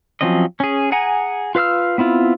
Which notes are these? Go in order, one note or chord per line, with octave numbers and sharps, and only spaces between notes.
F3 F#3 C4 C#4 D#5
C#4 G#4
G#4 F#5 G#5 A#5
F4 B4 F5 E6 F6
B3 C4 E4 F4